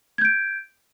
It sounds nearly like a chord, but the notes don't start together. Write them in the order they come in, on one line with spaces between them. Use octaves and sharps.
G#6 G6 D7